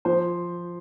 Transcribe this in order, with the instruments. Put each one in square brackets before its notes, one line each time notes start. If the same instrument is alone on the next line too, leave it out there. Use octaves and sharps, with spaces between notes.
[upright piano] F3 C5